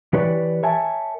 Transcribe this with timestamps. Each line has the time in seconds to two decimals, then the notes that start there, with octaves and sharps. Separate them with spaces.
0.13 E3 G4 B4 C#5 D5
0.63 A#4 C#5 E5 G#5 A5